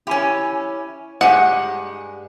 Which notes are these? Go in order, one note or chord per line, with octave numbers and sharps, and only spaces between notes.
C#4 E4 G4 G#5
G2 G#3 G4 F#5 G#5